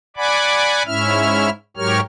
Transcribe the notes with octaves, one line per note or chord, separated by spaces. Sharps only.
D5 F#5 G#5 B5 D6
G#2 C#4 E4 E5 F6
G#2 F#3 G4 A#4 C#5 F6